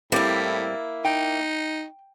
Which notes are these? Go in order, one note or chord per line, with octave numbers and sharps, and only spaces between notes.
A2 G3 A#3 C4 E4
D#4 G5